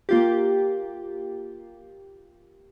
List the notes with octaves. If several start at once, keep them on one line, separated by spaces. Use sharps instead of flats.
A#3 F4 G4